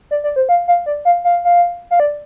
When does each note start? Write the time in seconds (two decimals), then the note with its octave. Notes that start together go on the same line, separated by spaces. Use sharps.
0.11 D5
0.24 D5
0.36 C5
0.49 F5
0.68 F5
0.86 D5
1.05 F5
1.24 F5
1.45 F5
1.91 F5
2.00 D5